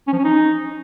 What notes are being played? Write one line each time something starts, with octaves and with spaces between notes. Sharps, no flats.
C#4
F3
C#4
D#4